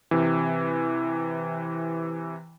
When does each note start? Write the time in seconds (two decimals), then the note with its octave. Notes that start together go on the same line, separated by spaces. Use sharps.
0.11 C3 E3